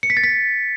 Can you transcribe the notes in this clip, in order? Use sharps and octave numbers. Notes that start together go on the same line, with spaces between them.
C#7
B6
A6
B6